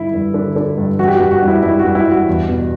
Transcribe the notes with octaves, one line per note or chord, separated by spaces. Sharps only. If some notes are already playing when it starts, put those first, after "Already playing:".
Already playing: G2 D3 E4
G2
D3
D3
G2
E3 F#4
G4
F#4
G2
F#4
G2
E4
G2 E4
F#4
G2
E4
G2
F#4
E2
B2